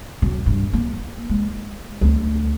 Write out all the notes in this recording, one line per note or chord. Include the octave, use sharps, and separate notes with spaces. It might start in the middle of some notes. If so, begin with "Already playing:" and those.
F#3
G2
A#3
G#3
D2 A3